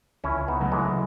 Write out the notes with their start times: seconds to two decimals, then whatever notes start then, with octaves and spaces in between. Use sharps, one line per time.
0.24 C#2 C#4 E4
0.48 B3 D#4
0.60 C#3 F#3 A3
0.72 E3 G#3